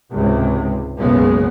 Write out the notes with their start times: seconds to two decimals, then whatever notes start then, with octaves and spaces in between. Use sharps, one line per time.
0.12 C#2 G#2 C3 G#3
0.98 F#1 B1 C#3 G#3 B3